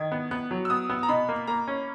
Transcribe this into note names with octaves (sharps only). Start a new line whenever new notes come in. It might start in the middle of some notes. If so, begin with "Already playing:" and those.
Already playing: D#3 G#6
B3
B3 F#6
F#3
E6
B3 D#6
B3
A#5
B2 B5
A#3
A#3 A#5
C#4